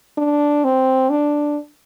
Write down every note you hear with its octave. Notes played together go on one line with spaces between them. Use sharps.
D4
C4
D4